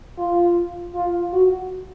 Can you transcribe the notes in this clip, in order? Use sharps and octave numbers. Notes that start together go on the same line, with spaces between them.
F4
F4
F#4